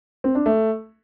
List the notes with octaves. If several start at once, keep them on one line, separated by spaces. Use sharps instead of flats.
C4
D4
A3